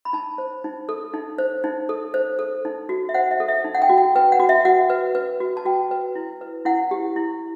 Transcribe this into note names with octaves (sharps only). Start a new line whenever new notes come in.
B5
D#4 A5
C5
D#4
A4
D#4
C5
D#4
A4
C5
A4
D#4
F#4
E5
C5 F#5
E5
A4
E5
D#4
F#5
G5
F#4
G5
B4 G5
F#5
F#4
E5
F#4 F#5
B4
B4
F#4
A5
F#4 G5
B4
E4
B4
E4 F#5
G4
E4